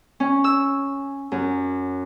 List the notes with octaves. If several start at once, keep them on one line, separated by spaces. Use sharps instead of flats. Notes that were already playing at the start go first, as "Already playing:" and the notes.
C#4
E6
F#2